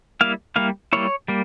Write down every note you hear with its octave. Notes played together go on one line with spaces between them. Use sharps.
G3 A#3 E4 F5
G3 A#3 E4 F5
G3 A#3 E4 C#5
G3 A#3